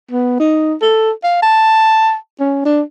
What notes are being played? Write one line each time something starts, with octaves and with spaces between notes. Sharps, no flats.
B3
D#4
A4
F5
A5
C#4
D4